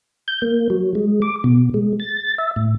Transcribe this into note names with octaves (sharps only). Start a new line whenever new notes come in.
G6
A#3
F#3
G#3
D6
B2
G#3
A6
E5
A2